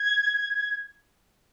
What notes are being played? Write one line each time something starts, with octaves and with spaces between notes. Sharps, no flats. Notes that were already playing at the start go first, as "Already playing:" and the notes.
Already playing: G#6